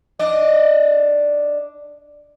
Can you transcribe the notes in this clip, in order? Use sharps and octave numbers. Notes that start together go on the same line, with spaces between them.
D4 D5 D#5